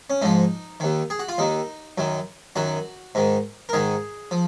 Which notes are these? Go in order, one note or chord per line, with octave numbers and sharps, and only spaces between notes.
C#4
G#2 F3 D#4
D#2 D#3
G#4
F#4
F4
D#2 D#3 D#4
F#2 D#3
F#2 D#3 F#4
G#2 D#3
A#4
G#2 D#3 G#4
F3